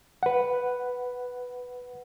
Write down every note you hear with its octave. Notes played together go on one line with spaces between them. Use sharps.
B4 F#5